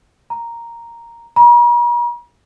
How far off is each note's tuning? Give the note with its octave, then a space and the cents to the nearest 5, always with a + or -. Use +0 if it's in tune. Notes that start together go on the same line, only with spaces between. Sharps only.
A#5 +0
A#5 +45